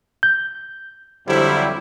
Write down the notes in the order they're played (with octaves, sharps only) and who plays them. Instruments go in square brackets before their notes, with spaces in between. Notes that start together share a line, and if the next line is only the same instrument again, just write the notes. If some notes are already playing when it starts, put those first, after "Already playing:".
[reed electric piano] G6
[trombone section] F2 F#3 G3 [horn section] D3 E4 [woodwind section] G4 C5